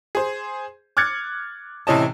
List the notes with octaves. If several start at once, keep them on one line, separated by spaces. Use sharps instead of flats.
G#4 C5
D6 F6 F#6 G#6 A6 C#7
A2 C3 E3 C#4 D#5 A5